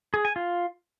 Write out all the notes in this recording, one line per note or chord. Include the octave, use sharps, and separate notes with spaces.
G#4
G#5
F4